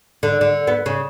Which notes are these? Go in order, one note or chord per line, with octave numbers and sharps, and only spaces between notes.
D3
D3
B3
C#3